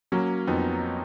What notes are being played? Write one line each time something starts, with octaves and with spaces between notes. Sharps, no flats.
F#3 A#3 C#4
F2 B3 D#4